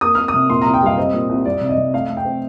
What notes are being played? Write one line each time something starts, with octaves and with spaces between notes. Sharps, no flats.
A#3 D#6
A#3 F6
D#6
C3
A#2 C6
C2 A#5
G5
G3 F5
C4 D#5
A#2
C2
G3 D5
C3
D#5
C3
A3 F5
A3
G5
C4